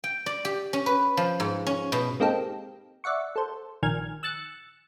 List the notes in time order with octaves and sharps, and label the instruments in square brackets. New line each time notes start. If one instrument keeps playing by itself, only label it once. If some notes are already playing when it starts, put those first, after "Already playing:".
[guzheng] G5
D5
G4
C#4
B4
F3
G#2
C#4
B2
[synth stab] G#3 A#3 C4 D#4 G4 A4
D5 E5 F#5 C#6
A4 C5
A#1 D#3 G#5 F6 G#6
E6 F#6 A6 C#7